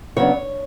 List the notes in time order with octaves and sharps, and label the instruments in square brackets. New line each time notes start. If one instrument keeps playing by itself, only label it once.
[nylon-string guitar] C#3 F#3 B3 D4 C#5